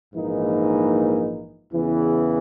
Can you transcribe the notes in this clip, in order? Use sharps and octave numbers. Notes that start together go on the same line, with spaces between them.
A#1 G#2 E3 A#3 D#4
E2 C#3 E3 B3